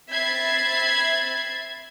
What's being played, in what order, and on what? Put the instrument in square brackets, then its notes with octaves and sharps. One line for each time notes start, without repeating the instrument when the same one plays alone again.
[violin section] C4 E5 B5 G#6 A6 C7